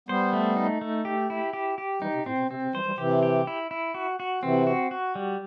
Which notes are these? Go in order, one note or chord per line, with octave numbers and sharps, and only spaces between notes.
G3 B3 C5
A3
D#4
A3
G4
E4
G4
G4
E3 G3 D#4
C3
A2 C4
B2
C3 C4
C3
E3 G3 C5
E3 G3
C3 E3 G4
G4
E4
E4
F#4
F#4
C3 E3 C4
F#4
F#4
G3